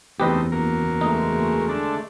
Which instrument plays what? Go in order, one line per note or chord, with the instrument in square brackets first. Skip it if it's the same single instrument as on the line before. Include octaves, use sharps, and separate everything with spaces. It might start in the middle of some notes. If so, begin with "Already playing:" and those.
[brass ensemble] F#1 E2 [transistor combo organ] A3 C4 D#4 [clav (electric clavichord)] G4 B4 D#5
[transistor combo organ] F#3 A#3 A#4
[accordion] G#3 A3 [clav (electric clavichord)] D#4
[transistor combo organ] D3 D4 A4